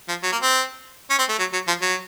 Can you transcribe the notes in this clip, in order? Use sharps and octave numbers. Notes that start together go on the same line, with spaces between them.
F3
F#3
A#3
C4
C#4
C4
A3
F#3
F#3
F3
F#3